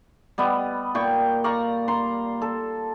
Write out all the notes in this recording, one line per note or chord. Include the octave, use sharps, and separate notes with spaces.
G3 B3 D#5
A#2 G5 C#6
D5 F5 A#5 C#6
A#5 C6
A4